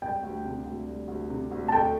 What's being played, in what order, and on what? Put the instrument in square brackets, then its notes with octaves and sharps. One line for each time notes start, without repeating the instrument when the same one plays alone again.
[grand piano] G3 [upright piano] G5
[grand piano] D2
C3
D2
G3
D2
C3
D2
[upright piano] A5
[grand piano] A3 [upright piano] G5